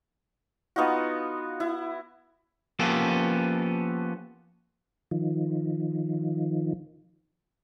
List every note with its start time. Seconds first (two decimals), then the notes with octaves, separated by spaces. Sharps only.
0.76 B3 D#4 F4 F#4
1.60 E4
2.79 F3 A#3 B3 C#4 G4 A4
5.11 D#3 F3